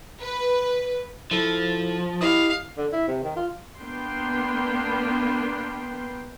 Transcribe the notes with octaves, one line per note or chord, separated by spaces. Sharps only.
B4
F3 E4 A4
E4 G4 D#5 F5 D#6
D3
E4
C3
D#3
F4
A#3 B3 D4 B4 G5 C6